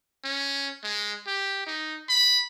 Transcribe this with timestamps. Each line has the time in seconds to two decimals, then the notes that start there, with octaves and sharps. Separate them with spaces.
0.24 C#4
0.83 G#3
1.27 G4
1.66 D#4
2.09 B5